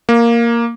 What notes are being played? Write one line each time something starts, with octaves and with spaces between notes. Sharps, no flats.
A#3